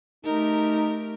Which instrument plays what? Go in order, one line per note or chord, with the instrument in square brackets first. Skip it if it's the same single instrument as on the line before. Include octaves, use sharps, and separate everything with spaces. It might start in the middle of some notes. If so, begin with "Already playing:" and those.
[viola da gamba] A3 G4 A#4 [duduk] D#4